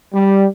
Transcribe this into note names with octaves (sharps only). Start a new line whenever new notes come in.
G3